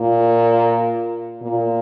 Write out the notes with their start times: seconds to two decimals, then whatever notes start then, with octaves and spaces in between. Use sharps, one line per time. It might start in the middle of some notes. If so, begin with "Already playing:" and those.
Already playing: A#2
1.42 A#2